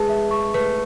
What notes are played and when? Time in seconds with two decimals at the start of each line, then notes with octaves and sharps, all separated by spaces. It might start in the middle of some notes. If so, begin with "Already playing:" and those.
Already playing: G#3 B4 A5
0.09 E5
0.31 C#6
0.54 A3 B4